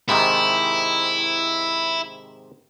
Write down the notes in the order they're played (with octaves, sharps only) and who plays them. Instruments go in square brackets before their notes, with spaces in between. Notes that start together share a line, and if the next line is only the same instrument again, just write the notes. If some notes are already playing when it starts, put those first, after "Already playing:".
[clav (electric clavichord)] G#2 C3 D#3 [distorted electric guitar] E4